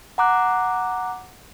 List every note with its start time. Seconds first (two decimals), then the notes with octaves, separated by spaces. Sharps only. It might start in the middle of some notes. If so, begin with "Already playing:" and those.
0.18 F#5 A#5 D6 F#6